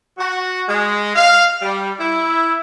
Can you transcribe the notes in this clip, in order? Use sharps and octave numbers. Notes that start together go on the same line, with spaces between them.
F#4
G#3
F5
G3
E4